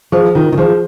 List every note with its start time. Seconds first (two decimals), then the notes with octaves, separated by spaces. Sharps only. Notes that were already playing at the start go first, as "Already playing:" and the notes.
0.12 F3 G#4 C5
0.35 D#3 F4
0.53 D#3
0.58 F3 G#4 C5